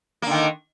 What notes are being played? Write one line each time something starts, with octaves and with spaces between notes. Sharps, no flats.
D3 D#3 A#3